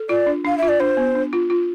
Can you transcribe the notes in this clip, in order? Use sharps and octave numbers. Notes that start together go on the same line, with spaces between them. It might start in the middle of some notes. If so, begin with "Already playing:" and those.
Already playing: A4
F4 D5
D4
D4 F5
F4 E5
D5
D4 C5
B3
D4
F4
F4